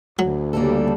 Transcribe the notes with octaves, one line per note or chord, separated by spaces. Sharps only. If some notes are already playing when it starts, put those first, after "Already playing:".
D2 F#3
C#3 G3 A#3 D4 A4